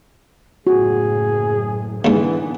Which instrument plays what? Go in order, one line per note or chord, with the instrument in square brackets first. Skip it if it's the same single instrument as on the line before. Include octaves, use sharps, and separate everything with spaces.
[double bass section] F#1 A2 [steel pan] F#4 [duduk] G#4
[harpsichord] D#2 G#2 [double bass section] D3 B3 [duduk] E3